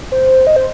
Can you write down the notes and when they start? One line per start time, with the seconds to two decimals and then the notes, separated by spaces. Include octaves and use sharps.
0.12 C5
0.47 D#5
0.56 C5